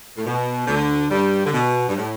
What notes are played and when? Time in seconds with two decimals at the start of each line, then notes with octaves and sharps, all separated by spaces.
0.18 A2
0.26 B2
0.67 D2 D3
1.10 G2 G3
1.46 D3
1.53 B2
1.89 G2
1.96 A2